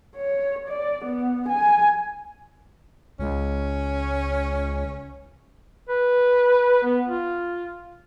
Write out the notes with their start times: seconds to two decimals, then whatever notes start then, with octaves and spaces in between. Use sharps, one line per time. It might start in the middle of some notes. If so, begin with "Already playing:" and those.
0.16 C#5
0.68 D5
1.05 B3
1.48 G#5
3.20 C#2 C#4
5.89 B4
6.83 B3
7.07 F4